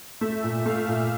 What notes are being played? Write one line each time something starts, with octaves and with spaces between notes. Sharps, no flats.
A3 E5
A#2
A3 F5
A#2